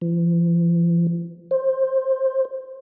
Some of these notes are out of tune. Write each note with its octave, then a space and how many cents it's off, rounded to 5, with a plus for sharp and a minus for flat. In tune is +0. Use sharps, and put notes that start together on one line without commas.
F3 -45
C5 +15